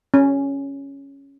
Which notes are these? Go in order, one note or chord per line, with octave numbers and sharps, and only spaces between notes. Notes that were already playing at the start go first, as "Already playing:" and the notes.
C#4